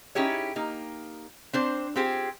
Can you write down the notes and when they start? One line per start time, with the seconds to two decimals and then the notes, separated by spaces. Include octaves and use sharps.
0.15 C#4 D#4 E4 G4 G#4 C#5
0.56 A#3 D#4 G4
1.53 C4 D4 C5
1.96 C4 F4 G4 G#4 C5